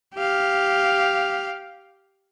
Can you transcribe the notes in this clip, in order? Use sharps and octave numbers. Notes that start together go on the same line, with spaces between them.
G4 F5